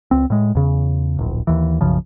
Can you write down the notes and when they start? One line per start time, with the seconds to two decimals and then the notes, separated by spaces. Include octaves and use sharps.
0.11 C#2 C4
0.30 A2 G#3
0.55 E2 C#3
1.19 D1 A#1
1.47 D#2 E3
1.81 B1 F#2 C#3 F3